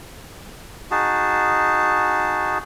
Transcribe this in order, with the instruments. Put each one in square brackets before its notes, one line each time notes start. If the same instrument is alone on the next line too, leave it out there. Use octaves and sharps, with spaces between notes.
[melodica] D#4 F#4 G#4 A5